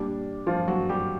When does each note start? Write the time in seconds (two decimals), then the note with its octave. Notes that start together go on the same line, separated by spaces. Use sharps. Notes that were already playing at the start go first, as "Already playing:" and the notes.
Already playing: A#2 G3 D4
0.46 F3 F4
0.68 F#3 F#4
0.89 G3 G4